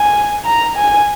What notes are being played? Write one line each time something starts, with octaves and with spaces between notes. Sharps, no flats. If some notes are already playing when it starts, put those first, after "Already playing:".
Already playing: G#5
A#5
G#5